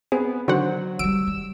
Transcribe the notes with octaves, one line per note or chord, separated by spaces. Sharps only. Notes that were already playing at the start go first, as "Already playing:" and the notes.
B3 C4 G#4
D3 D#3 F#3 F#4 C5 F#5
D#3 G3 E6 D7
G3